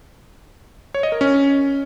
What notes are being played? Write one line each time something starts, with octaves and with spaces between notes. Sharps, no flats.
C#5
D#5
A#4
C#4